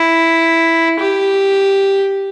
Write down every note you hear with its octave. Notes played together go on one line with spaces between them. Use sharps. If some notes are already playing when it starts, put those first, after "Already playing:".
Already playing: E4
G4